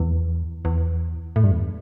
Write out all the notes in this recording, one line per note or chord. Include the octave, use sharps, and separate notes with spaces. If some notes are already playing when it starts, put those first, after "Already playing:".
Already playing: E2
E2
A2
G2
E2